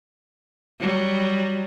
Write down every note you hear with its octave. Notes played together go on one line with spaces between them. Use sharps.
F#3 G3